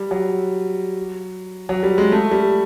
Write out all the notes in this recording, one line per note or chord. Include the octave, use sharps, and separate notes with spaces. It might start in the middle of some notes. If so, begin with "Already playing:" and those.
Already playing: G3
F#3
F#3
G3
G#3
A3
G3